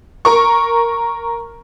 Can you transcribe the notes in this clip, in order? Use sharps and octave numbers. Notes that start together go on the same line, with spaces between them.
A#4 C#6